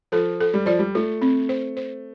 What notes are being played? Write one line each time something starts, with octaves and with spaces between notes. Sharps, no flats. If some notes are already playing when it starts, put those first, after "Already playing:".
F3 A4
A4
G3
F3 D5
G3
A3 F4
C4
C5
C5